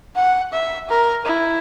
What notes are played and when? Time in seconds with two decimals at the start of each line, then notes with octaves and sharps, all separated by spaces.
0.16 F#5
0.52 E5
0.89 A#4
1.25 E4